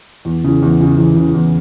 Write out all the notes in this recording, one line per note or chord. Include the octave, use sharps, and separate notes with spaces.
E2
C#3 E3
E2
C#3 E3
E2
C#3 E3
E2